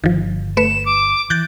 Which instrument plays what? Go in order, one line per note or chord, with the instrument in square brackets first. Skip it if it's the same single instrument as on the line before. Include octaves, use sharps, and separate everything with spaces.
[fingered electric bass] G1 [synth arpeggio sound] D#3 F3
[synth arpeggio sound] A3 B4 C#7 [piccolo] E7
[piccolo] D6
[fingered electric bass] E3 [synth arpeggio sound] F#6 G6 A6